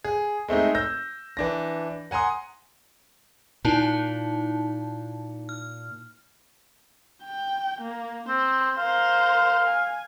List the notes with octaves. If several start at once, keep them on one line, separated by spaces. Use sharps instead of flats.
G#4
G#3 A3 C4 D#4
E6 G6 A#6
E3 D4 A#6
F#5 G#5 A#5 C6 D#6
A#2 D#4 E4 A5
F6
G5
A#3
C4 C5
A#4 C5 F5
G#5